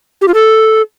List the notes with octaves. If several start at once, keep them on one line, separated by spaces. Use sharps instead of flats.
G4
F4
A4